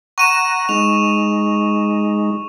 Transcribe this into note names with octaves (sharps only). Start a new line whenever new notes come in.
F#5 A#5 C#6 D#7 E7
G#3 D#4 F7